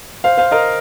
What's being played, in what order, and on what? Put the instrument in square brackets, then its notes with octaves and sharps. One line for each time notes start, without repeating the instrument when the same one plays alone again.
[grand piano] C5 F5
C5 F5
A#4 D#5